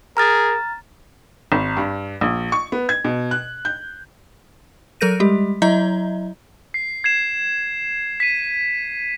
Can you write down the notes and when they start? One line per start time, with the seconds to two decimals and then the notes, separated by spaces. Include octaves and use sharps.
0.17 G#4 A#4 A#5 F6 A6
1.52 G#1
1.77 G2
2.21 A#1
2.52 C#6
2.72 B3
2.89 G#6
3.05 B2
3.31 F#6
3.65 G6
5.01 F#3 A4 A#4 G6 A#6 D#7
5.20 G3 G#3 G4
5.62 F#3 E4 D#5 E5 A#5 G6
6.74 C7
7.04 G#6 C7 E7
8.20 B6 D#7